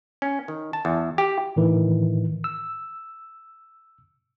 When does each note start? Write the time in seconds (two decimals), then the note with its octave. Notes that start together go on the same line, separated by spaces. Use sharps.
0.22 C#4
0.48 D#3
0.73 A5
0.85 E2
1.18 G4
1.56 A2 D#3 E3
2.44 E6